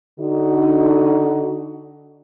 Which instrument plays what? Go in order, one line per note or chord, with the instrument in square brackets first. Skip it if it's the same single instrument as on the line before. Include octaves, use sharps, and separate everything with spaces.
[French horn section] D3 D#4 F#4